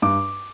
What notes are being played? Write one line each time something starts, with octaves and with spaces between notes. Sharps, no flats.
G2 D6